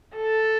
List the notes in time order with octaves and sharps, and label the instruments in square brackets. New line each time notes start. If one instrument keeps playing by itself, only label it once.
[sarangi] A4